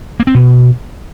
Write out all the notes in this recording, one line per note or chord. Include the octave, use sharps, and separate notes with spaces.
A#3
C4
B2